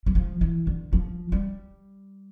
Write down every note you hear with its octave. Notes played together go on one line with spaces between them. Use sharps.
G3
F3
E3
D3
F3
G3